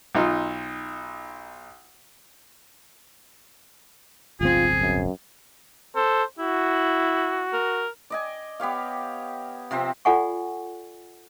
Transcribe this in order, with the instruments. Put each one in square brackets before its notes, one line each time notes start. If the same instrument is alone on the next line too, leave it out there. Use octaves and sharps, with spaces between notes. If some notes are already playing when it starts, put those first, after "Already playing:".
[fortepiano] B1 D#4 F4
[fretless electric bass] D1 G1 C4 [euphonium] F4 [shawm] G#4
[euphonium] F#2
[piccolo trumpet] A4 [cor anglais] C5
[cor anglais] E4 [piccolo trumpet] F#4
[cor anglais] A#4
[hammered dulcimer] D5 D#5 G#5
B3 G4 C#5 F5
C3 F3 C4 C5
[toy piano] F4 A4 D5 F#5 G#5 C#6